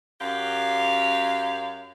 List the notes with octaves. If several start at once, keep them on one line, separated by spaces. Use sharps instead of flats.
F#2 G4 F5